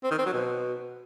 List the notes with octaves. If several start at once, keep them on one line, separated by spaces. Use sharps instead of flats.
C4
D#3
C4
F#3
B2